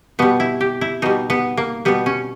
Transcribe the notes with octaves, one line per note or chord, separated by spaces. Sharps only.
B2 G3 B3
E4
G4
E4
B2 G3 D#4
B3
A#3
B2 G3 B3
C#4